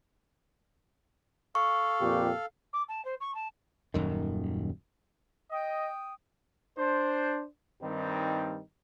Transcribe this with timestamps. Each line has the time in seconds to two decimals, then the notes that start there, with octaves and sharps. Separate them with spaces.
1.55 A4 F5 C#6
2.00 F2 A#2 G4
2.73 D6
2.89 A5
3.05 C5
3.21 C#6
3.35 A5
3.94 D#1 F#2 D#3
5.51 D#5 G5 D#6
6.77 D4 C5
7.82 G2 D#3 G3 C4 D#4